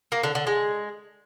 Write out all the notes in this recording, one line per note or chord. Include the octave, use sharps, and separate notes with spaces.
A#3
D3
D3
G#3